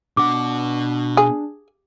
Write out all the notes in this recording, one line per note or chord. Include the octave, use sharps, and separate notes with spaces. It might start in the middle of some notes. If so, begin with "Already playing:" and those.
B2 D4 F#5 D6
G#4